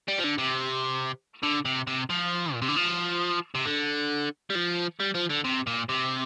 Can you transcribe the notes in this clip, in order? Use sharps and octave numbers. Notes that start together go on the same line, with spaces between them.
G3
F3
D3
C3
D3
C3
C3
F3
A#2
C3
D3
F3
C3
D3
G3
F3
G3
F3
D3
C3
A#2
C3